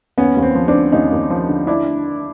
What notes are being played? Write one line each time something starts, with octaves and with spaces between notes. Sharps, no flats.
D#2 B3 C#4
D#2
C4
F3
C4 D4
D3
D#2 C#4 D#4
D#2
F3
D3
D4 E4